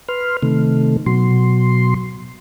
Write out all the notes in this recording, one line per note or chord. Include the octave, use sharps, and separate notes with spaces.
B4 C6 F6
C3 D#3 A3
B2 F#3 C6